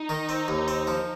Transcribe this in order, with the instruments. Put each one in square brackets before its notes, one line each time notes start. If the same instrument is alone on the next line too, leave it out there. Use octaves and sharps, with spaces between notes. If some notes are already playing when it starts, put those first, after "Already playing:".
Already playing: [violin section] D#4
[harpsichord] D#3
C4
D#2
C4
F3